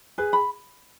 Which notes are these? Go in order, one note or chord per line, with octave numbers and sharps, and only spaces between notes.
G#4 B4
B5